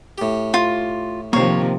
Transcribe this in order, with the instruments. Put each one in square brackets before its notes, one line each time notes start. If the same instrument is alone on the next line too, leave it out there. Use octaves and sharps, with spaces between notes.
[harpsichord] A2 G4
[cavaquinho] F4
[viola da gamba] C3 D#3 F3 [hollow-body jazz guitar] A#3 C5 [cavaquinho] C#5